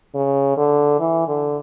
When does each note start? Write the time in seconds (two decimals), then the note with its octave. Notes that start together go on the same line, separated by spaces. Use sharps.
0.15 C#3
0.57 D3
0.99 E3
1.27 D3